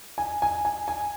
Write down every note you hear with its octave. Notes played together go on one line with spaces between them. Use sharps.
G#5
G#5
G#5
G#5